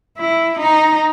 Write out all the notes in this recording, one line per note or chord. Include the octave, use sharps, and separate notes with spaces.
E4
D#4